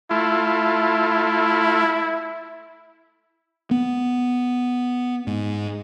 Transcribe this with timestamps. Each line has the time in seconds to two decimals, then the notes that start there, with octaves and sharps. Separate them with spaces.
0.11 A3 E4 F4
3.71 B3
5.27 G#2